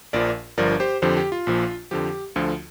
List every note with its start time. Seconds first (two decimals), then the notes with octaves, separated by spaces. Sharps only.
0.13 A#1 A#2 F3 A#4 D5
0.58 G1 G2 F3 A#4 D5
0.80 G4 C5
1.02 F2 D3 F3 G4 C5
1.17 G4
1.32 F4
1.47 A#1 A#2 F3
1.91 F2 D3 F3 G4
2.36 D2 D3 F3 F4